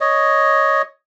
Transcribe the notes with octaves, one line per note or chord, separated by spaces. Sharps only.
C#5 D#5